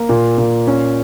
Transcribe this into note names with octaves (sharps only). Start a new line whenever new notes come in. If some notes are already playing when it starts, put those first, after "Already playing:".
Already playing: A#3
A#2
A#2
C#4